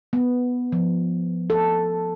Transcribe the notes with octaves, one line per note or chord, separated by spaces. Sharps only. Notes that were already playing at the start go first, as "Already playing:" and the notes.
B3
F3
A4